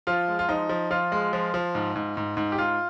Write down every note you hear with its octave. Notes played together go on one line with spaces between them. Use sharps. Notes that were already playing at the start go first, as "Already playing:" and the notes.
F3 F4
G#3
F4
F3 D#4
F3
F3 F4
G#3
F3
F3
G#2
G#2
G#2
G#2
G4
G#2 F4